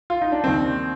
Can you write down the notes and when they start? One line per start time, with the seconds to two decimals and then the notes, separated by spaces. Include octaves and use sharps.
0.10 F4
0.22 D#4
0.32 D4
0.43 D#2 D#3 G3 C4